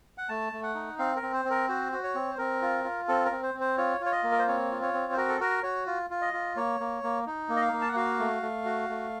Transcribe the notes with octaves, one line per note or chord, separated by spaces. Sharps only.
F#5
A3 A5
A3
F#5
D#4
C4 F5
A#4
C4
C5
C4
A#4
F#4 C5
F#4
C#5
C4
C5
C4 A#4
F4
F4
C4 A4
A#4
C4
C5
C4
C5
F4 C#5
F4
C#5
D#5
A#3
A#4
C5
C4 C#5
F4
C#5
C4
C5
F#4 A#4
A4
F#4 A#4
F#4 C#5
F4
F4
D#5
F4
A#3 C#5
A#3
A#3
D#4
A#3
D#5
F5
A#3
A5
F#5
F#4 F5
A3
A3
F#4
A3